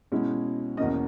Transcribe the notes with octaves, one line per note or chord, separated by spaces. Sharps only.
B2 G#3 C#4 E4
E2 B2 A#3 C#4 D#5